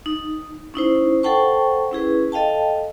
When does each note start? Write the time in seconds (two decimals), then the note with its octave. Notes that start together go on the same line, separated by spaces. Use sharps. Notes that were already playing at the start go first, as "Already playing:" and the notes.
0.06 D#4
0.74 C#4 D#4 E4 C5
1.23 A4 C5 F#5 G5 A5 C#6
1.92 C#4 E4 G#4 B4
2.32 A4 D#5 F5 G5 A5